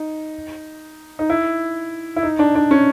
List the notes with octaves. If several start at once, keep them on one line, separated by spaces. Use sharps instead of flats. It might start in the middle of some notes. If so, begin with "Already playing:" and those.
Already playing: D#4
D#4
E4
E4
D#4
D4
D4
C#4